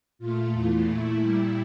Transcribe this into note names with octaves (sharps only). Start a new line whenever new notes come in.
A#2 A3 F4
E2 E3 A3
A#2 A3 E4
A#2 G3